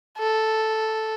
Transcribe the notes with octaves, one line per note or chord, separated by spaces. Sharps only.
A4